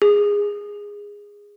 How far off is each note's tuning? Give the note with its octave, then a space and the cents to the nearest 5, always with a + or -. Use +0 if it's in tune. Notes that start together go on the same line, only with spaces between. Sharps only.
G#4 -15